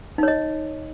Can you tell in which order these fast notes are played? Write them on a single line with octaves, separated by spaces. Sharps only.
D#4 C#5 D#5